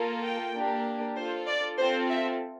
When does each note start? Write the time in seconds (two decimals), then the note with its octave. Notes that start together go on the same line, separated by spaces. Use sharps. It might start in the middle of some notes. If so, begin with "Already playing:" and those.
Already playing: A#3 F4 A4
0.23 G5
0.54 A#3 D4 G4
1.16 D4 F4 A4 C5
1.47 D5
1.78 C4 F4 A4 C5
2.09 E5